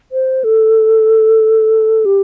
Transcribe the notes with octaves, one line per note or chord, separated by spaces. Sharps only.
C5
A4
G4